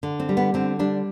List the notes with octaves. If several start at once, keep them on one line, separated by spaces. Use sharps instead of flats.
D3
C4
G3
B3
D3 C4
G3 D4